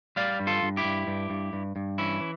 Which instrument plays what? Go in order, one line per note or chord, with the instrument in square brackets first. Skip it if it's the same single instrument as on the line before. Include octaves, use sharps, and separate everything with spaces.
[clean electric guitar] G3 D5 F5
G2
F4 A4
G2
E4 G4
G2
G2
G2
G2
G2
E3 C#4 E4
E3